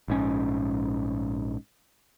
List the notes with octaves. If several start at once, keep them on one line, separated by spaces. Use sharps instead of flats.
A#1 G#2 C#4